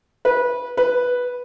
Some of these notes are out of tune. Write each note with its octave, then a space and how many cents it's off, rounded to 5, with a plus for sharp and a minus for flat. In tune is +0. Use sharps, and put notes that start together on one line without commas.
B4 -20
B4 -5